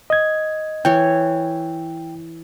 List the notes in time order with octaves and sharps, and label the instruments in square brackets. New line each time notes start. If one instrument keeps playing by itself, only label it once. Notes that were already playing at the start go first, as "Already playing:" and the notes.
[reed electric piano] D#5 G#6
[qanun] E3 C#5 [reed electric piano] G5